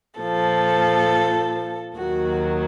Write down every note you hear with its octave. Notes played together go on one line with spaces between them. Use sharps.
A#2 F3 A4
D#2 D#3 F#3 F#4